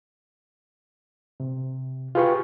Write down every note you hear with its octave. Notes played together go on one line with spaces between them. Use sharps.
C3
F4 G4 G#4 B4 G5 C#6